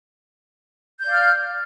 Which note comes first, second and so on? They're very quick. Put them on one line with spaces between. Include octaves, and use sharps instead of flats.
G6 D5 F5 F6